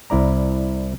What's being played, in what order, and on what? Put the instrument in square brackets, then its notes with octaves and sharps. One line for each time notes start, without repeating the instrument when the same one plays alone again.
[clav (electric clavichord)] C2 E4 D5 A#5